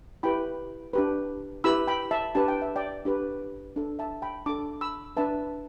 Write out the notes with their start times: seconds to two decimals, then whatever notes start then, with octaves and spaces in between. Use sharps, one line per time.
0.23 E4 G4 B4 G5 B5
0.93 D4 G4 B4
1.64 E4 G4 B4 B5 E6
1.87 G5 B5
2.11 E5 A5
2.35 D4 G4 B4 A5
2.48 G5
2.62 E5
2.76 D5 G5
3.05 D4 G4 B4
3.76 D4 A4
3.99 E5 A5
4.22 G5 B5
4.46 D4 A4 A5 D6
4.81 B5 E6
5.17 D4 B4 E5 A5